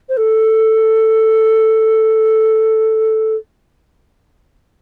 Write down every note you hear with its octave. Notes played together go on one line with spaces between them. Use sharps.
C5
A4